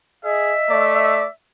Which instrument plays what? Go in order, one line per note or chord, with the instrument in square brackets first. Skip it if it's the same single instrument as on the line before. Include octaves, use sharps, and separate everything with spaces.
[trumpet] G#4 [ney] D#5 [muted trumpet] E5
[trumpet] A3 [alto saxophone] D5